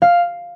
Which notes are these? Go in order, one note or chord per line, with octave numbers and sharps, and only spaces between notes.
F5